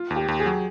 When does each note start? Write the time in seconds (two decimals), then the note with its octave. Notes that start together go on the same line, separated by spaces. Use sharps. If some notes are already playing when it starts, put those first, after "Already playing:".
Already playing: F4
0.10 D#2
0.16 G4
0.28 D#2
0.40 G#4
0.46 F#3